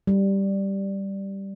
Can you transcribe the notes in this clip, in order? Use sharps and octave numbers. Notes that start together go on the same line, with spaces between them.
G3